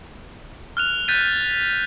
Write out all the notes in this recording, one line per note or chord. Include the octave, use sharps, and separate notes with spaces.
F6 F#6 F7
F#6 G6 A6 B6 D#7